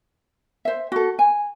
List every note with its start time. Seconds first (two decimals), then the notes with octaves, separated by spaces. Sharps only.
0.65 C5 E5
0.92 F#4 A4
1.19 G#5